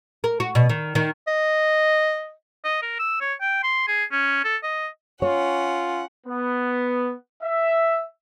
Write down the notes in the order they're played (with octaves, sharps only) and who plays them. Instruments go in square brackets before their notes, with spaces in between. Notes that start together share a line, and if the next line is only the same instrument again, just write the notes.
[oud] A#4
F#4
B2
D#3
D#3
[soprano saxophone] D#5
[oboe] D#5
A#4
E6
C#5
G5
C6
G#4
C#4
A4
D#5
[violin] C#4 F#5 [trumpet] F4 [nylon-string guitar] C#5
[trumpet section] B3
E5